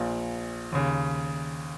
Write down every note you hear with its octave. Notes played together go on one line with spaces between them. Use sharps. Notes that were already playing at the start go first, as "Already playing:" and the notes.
Already playing: A#1 A#2
D#2 C#3